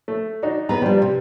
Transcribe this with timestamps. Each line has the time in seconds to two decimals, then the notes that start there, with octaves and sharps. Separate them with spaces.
0.08 A3
0.43 D4 D#4 F#4
0.69 B3 G#4 B4 A#5
0.82 F3 G3 D4 G4
1.02 C3